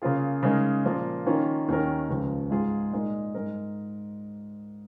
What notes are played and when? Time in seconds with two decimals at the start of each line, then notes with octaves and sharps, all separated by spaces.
0.02 C#3 A#3 F4 G#4
0.43 C#3 G#3 D#4 A#4
0.85 A#2 F3 A#3 F4 A#4
1.26 D#3 A#3 C#4 F4
1.68 D#2 D#3 C#4 A#4
2.09 C#2 C#3 F3
2.51 G#2 G#3 F4 G#4
2.92 A#2 G#3 D#4 A#4
3.35 G#2 G#3 D#4 A#4